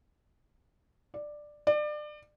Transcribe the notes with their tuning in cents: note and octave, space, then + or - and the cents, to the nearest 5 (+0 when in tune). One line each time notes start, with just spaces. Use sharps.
D5 +10
D5 +30